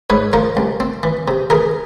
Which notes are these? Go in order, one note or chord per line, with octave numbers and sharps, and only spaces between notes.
G#2 B4 C#5
F3 A#4 C5
C2
C4
E3
C3
E3 G#4 A#4